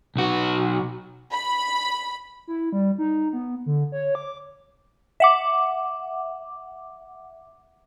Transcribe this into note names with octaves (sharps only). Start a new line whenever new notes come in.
B1 F#4
B5
E4
G3
D#4
B3
D3
C#5
D6
E5 F#5 D6